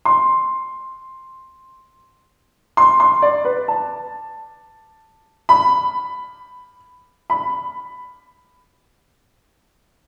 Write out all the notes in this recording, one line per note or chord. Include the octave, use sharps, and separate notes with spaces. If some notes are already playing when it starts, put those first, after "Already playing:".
C6
C6
C6
D5
B4
A5
B5
B5